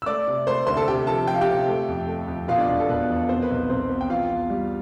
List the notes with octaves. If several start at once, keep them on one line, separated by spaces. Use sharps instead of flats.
E6
A3 D5 D6
C3
A3 C5 C6
D2 C5 C6
A4 A5
C3 G4 G5
F3 A4 A5
F3 G5
F5
G4 G5
C3
A3
F2
A3
F2
B2 F4 F5
D4 D5
E1
A4
E1 B4
E2
B3 C4 C5
B4
B1
B4
B1 C4 C5
B3
G5
E2 F4 F5
E2
G3